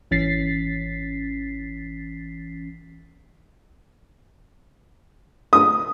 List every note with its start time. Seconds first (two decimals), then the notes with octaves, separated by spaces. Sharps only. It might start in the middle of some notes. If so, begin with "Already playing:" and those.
0.11 G#1 E3 C#4 A6 B6 C7
5.53 D#6